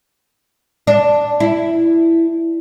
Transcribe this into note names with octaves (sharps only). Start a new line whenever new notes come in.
D4
E4